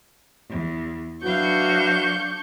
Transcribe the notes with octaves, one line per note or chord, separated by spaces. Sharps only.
E2
F#3 D4 E4 F#4 B4 F5 C#6 G6